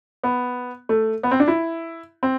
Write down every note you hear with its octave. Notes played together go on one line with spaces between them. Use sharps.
B3
A3
B3
C4
D4
E4
C4